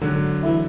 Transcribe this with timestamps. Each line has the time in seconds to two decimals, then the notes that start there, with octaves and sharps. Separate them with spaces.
0.01 G#2 D3 F#3
0.43 E3 A3 E4